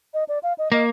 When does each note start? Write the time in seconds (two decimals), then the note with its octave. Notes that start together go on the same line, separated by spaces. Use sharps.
0.14 D#5
0.28 D5
0.43 F5
0.58 D#5
0.72 A#3 D#5